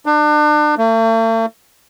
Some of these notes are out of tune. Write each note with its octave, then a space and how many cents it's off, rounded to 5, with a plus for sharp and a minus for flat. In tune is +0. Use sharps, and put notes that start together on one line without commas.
D4 +35
A3 +45